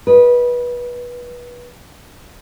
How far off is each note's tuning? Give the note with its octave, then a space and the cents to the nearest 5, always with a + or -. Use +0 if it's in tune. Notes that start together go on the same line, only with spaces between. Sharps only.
B4 -20 D#5 +0